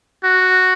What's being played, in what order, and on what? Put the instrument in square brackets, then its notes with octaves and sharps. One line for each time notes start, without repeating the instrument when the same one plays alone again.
[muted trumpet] F#4